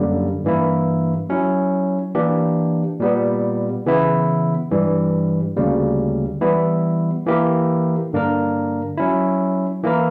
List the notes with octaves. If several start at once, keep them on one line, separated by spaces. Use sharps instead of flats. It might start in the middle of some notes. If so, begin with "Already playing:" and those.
Already playing: F#2 D3 G3 A#3
G2 E3 A#3 E4
F#3 C#4 E4
E3 A#3 D4 G4
A#2 G3 B3
C#3 E3 B3 E4
G2 E3 G3
D2 C#3 G3 A#3
E3 G3 B3 E4
E3 A#3 E4 G4 A#4
G2 D3 A#3 D4 A#4
F#3 C#4 E4
E3 A#3 E4 A#4